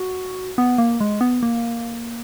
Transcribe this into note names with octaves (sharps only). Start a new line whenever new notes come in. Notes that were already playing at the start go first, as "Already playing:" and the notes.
Already playing: F#4
B3
A#3
G#3
B3
A#3